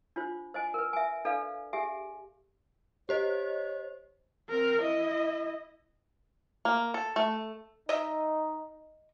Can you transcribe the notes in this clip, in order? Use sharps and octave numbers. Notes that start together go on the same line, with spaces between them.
D4 F4 C5
C5 D#5 G#5
A#4 B4
E5 G#5
D4 A4 B4 D5 F5
G4 G#4 E5 G#5
G4 C5 C#5 D#5
C4 A#4
E4 D#5
A#3
A4
A3
D#4 D#5 E5